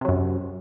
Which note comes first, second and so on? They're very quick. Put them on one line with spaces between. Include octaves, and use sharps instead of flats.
C3 F#3 F#2